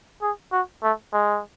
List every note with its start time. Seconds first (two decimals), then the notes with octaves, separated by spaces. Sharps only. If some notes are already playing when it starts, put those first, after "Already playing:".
0.22 G#4
0.52 F#4
0.83 A3
1.13 G#3